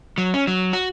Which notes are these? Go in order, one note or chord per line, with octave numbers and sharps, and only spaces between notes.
F#3
C#4
F#3
F#4